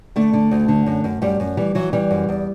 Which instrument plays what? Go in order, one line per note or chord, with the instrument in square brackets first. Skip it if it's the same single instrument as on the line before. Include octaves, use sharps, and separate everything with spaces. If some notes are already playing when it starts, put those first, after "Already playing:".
[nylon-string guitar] D3 A3
D3
D2
D3
F#2
F#2
F#2 G3
F#2
E3 G3
E3 F#3
E3 G3
F#2
E2